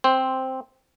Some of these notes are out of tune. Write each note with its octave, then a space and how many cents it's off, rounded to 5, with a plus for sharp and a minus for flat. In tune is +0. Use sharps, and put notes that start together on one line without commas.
C4 +0 C5 +5